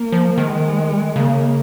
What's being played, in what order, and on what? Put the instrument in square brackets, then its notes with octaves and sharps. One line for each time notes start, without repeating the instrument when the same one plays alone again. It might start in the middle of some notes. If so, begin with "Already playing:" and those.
Already playing: [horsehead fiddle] A#3
[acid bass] F3
[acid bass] D#3 [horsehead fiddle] G#3
[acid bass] C#3 [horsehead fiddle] A#3